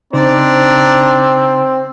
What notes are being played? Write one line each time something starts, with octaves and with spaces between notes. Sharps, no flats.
C#3 C4 D4 D#4 C5 D5 A#5